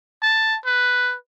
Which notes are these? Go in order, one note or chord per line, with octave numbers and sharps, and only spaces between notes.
A5
B4